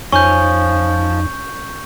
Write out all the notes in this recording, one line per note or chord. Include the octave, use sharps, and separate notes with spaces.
F2 F3 C#4 D#4 C#6 G6